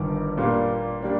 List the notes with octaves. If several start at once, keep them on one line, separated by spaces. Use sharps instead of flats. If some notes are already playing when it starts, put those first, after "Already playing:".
Already playing: G1 G2 D#3 D6
A#2 G3 A#3 D4 F4
G3 A#3 D4